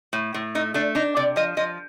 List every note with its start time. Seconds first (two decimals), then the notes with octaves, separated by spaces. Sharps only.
0.13 A2
0.34 A2
0.55 A3 D#4
0.74 A3 D4
0.95 D4 D#4
1.16 C3 D5
1.36 F3 D#5
1.57 F3 D#5